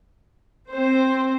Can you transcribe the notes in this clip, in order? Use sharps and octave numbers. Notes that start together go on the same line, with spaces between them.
C4 C5